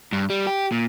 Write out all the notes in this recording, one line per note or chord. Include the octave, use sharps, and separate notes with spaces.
G2
G3
G4
A#2